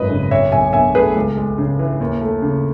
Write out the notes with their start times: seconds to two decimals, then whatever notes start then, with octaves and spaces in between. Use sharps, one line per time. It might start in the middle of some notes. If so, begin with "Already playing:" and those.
Already playing: G#1 F#2 E3 B4 D#5
0.10 C#3
0.31 B1 C#5 E5
0.52 B1 E5 G#5
0.73 B2 E5 G#5
0.94 A3 G#4 B4
1.15 C#2
1.37 G#3
1.58 C#3
1.79 E3
2.00 D#2
2.21 A3
2.42 C#3